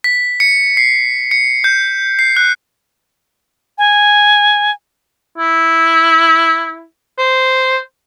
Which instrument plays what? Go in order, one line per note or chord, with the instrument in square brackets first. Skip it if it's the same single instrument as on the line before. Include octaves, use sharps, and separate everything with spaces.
[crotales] B6
C#7
C7
C#7
G6
C7
F#6
[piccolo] G#5
[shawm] E4
C5